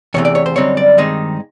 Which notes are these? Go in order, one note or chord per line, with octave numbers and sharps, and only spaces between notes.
E2 C3 E3 A3 C#5
D5
C#5
C5
F#2 D3 G3 C4 D#4 C#5
D5
G2 D#3 G#3 C4 D#4